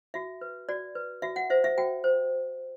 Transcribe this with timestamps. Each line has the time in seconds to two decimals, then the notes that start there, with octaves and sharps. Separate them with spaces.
0.14 F#4 E5
0.41 B4
0.69 F#4 D5
0.95 B4
1.22 F#4 E5
1.36 F#5
1.50 C5 E5
1.64 E5
1.78 F#4 G5
2.04 C5